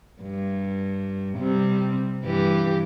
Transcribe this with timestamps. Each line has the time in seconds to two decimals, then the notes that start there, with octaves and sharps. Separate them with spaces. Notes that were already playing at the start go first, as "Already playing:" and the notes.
0.22 G2
1.38 C3 G3 C4
2.23 G2 E3 G4